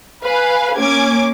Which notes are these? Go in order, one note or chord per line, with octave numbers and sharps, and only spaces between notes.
B4 F5 G#5
A#3 C#4 G#5 D6 G#6